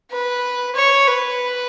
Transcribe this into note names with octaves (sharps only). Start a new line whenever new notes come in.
B4
C#5
B4